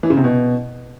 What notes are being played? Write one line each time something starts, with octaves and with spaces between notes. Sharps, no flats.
E3
C#3
C3
B2